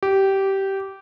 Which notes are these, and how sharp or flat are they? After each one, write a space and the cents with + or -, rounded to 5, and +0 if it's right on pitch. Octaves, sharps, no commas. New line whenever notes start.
G4 -15